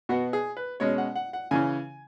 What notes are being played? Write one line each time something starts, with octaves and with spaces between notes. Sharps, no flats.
B2 B3 F#4
G#4
B4
B2 G#3 C#4 C#5
F#5
F#5
F#5
C#3 E3 C#4 G#5